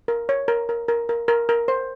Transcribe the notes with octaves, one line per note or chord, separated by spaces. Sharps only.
A#4
C#5
A#4
A#4
A#4
A#4
A#4
A#4
C5